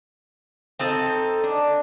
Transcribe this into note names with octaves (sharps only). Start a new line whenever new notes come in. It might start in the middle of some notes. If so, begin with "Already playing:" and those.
C4 D#4 A4
D4